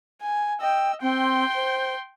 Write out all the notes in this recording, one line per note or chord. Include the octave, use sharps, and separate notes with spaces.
G#5
D#5 G5 E6
C4 G5 C6
C5